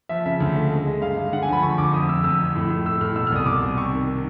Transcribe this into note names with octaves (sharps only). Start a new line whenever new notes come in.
F3 E5
C#3 E5
D2
A3
G#3
G#3
G2 F5
G#3
D3 F#5
G#5
F3 B5
D2 C#6
D2 D6
F2 D#6
F2 E6
F2 E6
F2
A2
A2
A3 E6
A2 F6
B2 E6
F6
C2 D#6
C2 D6
C2
C3 C#6
D#3
D#3